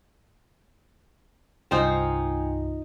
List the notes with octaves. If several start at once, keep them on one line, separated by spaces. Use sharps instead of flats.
C2 G2 D#4 F4 C5 G5 G#5